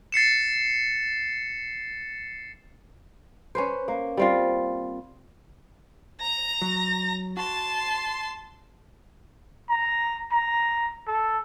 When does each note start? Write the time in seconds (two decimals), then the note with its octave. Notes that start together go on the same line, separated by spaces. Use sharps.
0.12 A6 C7 C#7 E7
3.55 C#4 B4 C5
3.88 A#3
4.17 G3 C4 F4
6.20 A#5 A#6
6.62 F#3
7.37 F#4 A5 C6
9.70 A#5
10.32 A#5
11.07 A4